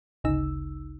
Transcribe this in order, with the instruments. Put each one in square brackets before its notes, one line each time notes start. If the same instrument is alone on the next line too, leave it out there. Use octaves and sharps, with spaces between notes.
[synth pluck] G#1 D2 C#3 D#4 E6